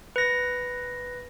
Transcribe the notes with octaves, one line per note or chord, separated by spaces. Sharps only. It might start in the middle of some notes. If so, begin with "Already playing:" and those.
B4 A#6